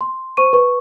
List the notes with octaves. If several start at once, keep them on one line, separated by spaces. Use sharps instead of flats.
C6
C5 C#6 D#7
B4 C#6